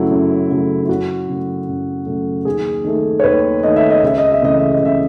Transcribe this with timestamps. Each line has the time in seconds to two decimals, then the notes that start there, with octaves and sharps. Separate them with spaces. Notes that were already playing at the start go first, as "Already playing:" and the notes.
Already playing: F#2 C#3 F#3 A3 E4
0.11 F#2
0.50 C#3 F#3 A3
0.83 E4
0.89 F#2 F#4
1.28 C#3 F#3 A3
1.68 F#2
2.06 C#3 F#3 A3
2.45 D#2 G#4
2.84 D#3 A3
3.20 C#5
3.24 D#2 B4
3.63 D#3 A3 D#5
3.76 E5
3.90 D#5
4.03 C#2 E5
4.18 D#5
4.32 E5
4.42 C#3 E3 A3 D#5
4.58 E5
4.72 D#5
4.81 C#2 E5